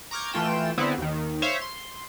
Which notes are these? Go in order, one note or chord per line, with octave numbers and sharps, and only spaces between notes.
A#5 C#6 D6 F6 G6 G#6
E3 A3 F4 G5 E7
D3 B3 C4 E4
D#2 D#3
C5 C#5 E5 F5
C6